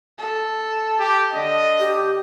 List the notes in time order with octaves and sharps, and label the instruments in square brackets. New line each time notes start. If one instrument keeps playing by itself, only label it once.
[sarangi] A4
[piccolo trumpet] G4
[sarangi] D3 [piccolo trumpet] D#5
[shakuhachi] G4